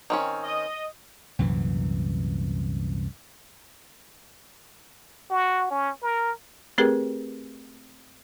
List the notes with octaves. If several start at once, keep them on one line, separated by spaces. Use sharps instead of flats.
D#3 C4 C#4
D#5
C2 F#2 A#2 E3
F#4
C#4
A#4
A3 C4 G4 G#4 A#4 B4